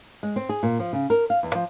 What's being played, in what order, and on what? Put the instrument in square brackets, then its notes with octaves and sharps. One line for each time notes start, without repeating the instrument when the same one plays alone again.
[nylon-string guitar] G#3
C4
G#4
A#2
F3
C#3
A#4
F5
E2
F3